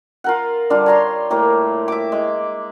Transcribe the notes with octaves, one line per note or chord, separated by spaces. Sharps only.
F4 A#4 F#5
D3 G3 D4 F4
C#5 A#5 C6
A2 A#3 G4
E5 D6
G#3